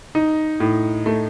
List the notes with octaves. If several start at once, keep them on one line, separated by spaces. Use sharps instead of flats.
D#4
A2
A3